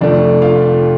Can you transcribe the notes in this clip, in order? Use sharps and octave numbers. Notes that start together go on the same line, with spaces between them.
F1 F2 F3 A3 D4 D5
F4 F5